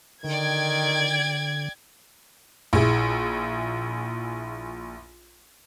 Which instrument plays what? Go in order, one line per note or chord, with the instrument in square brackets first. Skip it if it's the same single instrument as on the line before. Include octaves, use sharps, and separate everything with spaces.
[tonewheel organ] D3 [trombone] D#3 [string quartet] D5 G5 [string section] G#6
[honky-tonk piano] A#1 E4 G#4